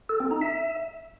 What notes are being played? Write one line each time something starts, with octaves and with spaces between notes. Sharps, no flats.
A4
C4
D#4
E5